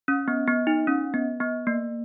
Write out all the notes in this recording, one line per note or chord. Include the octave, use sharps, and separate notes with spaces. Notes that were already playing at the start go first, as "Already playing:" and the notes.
C#4
B3
B3
D#4
C#4
B3
B3
A#3